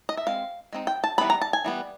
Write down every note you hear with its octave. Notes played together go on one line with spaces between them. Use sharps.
D#5
E5
G#3 C4 F5
G#3 C4 D#4
G5
A5
E3 G3 B3 B5
A#5
A5
G#5
E3 G3 B3